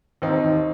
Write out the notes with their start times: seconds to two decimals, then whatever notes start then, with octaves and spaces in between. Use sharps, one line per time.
0.22 D#2 C4 D#4
0.44 D#2